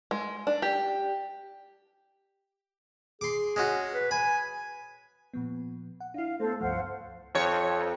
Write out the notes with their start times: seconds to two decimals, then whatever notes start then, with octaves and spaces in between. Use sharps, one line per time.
0.11 G#3
0.47 D4
0.62 G4
3.21 G#4 C6 D6
3.56 G#3 C#4 F#4
3.94 B4
4.11 G#5 B5
5.34 A#2 F3 B3
6.00 F#5
6.14 D4 E4 F5
6.40 A3 B3 A4 C5
6.61 C#2 G2 F3 C5 F5 F#5
7.35 F2 C#5